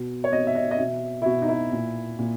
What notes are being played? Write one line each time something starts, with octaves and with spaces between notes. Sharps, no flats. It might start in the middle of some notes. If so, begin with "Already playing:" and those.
Already playing: B2
C#5
B2 D#5
E5
D#5
D#5
B2 E5
E4
B2 F#4
D#4
E4
A#2
A#2